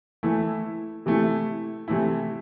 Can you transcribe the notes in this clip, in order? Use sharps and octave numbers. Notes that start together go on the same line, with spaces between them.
E3 A3 E4
C3 E3 A3 E4
C3 E3 A3 E4